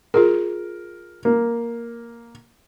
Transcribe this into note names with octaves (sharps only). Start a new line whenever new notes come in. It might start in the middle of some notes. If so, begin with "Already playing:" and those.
F4 G#4 A#4
A#3